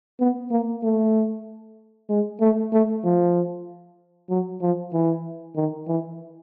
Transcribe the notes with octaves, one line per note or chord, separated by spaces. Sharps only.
B3
A#3
A3
G#3
A3
A3
F3
F#3
F3
E3
D#3
E3